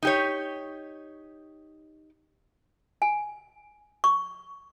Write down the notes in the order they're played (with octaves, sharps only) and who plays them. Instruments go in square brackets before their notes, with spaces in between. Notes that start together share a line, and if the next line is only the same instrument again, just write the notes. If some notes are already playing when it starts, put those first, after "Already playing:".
[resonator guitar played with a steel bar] D#4 G4 C#5
[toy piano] G#5
C#6